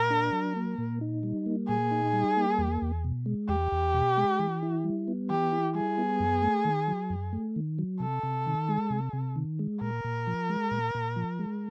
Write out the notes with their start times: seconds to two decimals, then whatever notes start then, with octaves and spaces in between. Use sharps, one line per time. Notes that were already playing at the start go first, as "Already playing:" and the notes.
Already playing: A#2 A#4
0.10 D4
0.32 F#3
0.56 A#3
0.78 A#2
1.01 D#4
1.23 G3
1.46 A#3
1.68 A#2 G#4
1.91 D#4
2.13 G3
2.37 A#3
2.58 E2
2.82 E2
3.04 B2
3.26 G#3
3.48 E2 G4
3.72 E2
3.94 B2
4.17 G#3
4.39 E3
4.63 E4
4.84 G3
5.08 B3
5.30 E3 G4
5.52 E4
5.74 G3 G#4
5.98 B3
6.20 F#2
6.42 A3
6.65 D#3
6.88 F#3
7.10 F#2
7.33 A3
7.56 D#3
7.79 F#3
8.00 C3 A4
8.23 C3
8.46 D#3
8.69 G#3
8.90 C3
9.13 C3
9.36 D#3
9.59 G#3
9.81 A#2 A#4
10.04 A#2
10.27 F3
10.50 G#3
10.71 A#2
10.95 A#2
11.16 F3
11.39 G#3